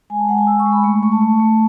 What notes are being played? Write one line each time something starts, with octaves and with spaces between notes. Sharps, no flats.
G#3 G#5
A5
G#3 F#5
G#5
G#3 E6
C#6
G#3
B5
A3 C#6
A3 C#6
A5
A3
A3